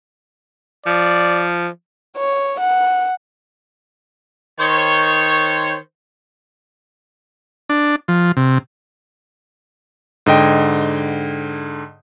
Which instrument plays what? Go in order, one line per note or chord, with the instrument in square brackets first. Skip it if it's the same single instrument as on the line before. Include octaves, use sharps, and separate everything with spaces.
[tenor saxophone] F3 [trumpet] D5
[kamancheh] C#5
F#5
[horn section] D#3 C5 C#5
[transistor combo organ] D4
F3
C3
[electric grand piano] G#2 D3 D#5 G5